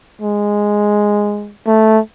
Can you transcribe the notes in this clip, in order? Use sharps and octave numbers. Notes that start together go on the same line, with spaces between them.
G#3
A3